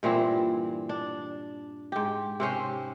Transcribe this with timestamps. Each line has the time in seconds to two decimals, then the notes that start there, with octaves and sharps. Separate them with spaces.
0.03 G2 A#2 E3 C4
0.89 D4
1.92 G#2 G4
2.40 C3 C4 C#4 C5